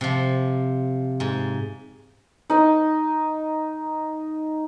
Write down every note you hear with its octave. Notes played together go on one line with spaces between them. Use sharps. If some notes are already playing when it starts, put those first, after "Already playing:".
C3 F3
G#2
D#4 D#5